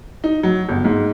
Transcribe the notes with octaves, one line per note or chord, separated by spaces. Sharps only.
D#4
F#3
G1
G#2